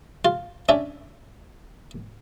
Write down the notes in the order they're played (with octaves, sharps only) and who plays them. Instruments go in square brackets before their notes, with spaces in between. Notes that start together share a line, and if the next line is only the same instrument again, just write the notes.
[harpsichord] F4
C#4 D4 E5